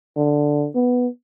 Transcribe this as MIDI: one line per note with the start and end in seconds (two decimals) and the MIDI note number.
0.16 0.67 50
0.75 1.07 59